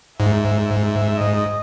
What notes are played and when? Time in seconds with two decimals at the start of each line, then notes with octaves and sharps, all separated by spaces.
0.19 G#2 E5
0.85 E5
1.17 D#5